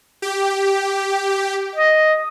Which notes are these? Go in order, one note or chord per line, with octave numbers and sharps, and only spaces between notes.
G4
D#5